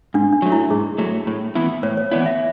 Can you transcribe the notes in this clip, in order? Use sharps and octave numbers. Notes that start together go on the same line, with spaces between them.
G#2 D4
D4
F#3 A3
E4
G#2 G#4
F#3 A3
A2
E3 B3 E4
A2 C#5
C#5
E3 B3 E4 D5
E5